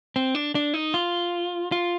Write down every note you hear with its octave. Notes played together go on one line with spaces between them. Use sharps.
C4
D4
D4
D#4
F4
F4